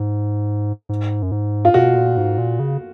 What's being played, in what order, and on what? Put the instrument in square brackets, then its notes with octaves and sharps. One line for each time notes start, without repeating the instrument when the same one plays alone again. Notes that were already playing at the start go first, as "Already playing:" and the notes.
Already playing: [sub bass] G#2
G#2
F#2
G#2
[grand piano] F4
[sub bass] B2 [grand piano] F#4
[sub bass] A#2
G#2
A#2
C#3